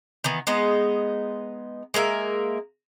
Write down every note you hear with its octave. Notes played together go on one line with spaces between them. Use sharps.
D#3 E3 B3
G#3 B3 D#4 D#5
G#3 A#3 A#4 E5